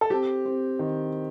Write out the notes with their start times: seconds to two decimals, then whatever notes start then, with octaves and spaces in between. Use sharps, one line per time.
0.01 A4
0.10 C4 G4
0.45 C4
0.79 D#3